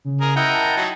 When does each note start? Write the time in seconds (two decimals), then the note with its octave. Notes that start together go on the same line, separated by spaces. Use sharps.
0.05 C#3
0.21 G#4 A#4
0.36 E4 A#4 D#5 F#5 G5
0.53 A5
0.77 F#3 D#4